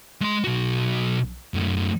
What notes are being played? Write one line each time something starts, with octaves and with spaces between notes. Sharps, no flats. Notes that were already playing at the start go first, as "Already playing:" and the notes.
G#3 C6
B1 F#4
F#2 A3